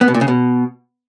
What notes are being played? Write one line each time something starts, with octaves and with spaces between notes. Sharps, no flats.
B3
B2
A#2
C#3
B2